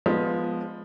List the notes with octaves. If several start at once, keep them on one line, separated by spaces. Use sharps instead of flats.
F3 G#3 B3